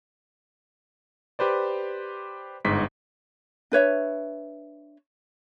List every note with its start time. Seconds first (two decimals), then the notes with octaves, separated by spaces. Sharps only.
1.39 G4 B4 C5 D5
2.65 G1 G#2 B6
3.72 D4 B4 C#5 E5